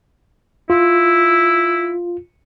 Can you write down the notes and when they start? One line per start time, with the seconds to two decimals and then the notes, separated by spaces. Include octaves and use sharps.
0.70 E4 F4